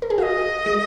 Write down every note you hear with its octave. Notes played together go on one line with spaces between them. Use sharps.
A#4
G#4
F#4 D#5 F5
G#3